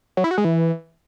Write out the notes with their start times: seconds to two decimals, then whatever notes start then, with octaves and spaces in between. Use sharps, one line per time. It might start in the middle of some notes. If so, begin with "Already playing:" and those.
0.17 F#3
0.24 E4
0.31 F#4
0.38 G#3
0.45 E3